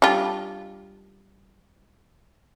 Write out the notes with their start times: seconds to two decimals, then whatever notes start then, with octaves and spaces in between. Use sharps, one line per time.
0.02 G3 D4 F4